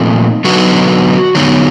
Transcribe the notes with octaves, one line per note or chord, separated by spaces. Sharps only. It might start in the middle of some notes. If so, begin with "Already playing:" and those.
Already playing: A#2 F3 A3 C4 D#4
D3 F#3 B3 D#4 F#4
D3 F#3 B3 D#4